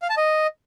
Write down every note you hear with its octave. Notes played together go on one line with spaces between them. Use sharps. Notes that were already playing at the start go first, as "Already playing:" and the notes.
F5
A5
D#5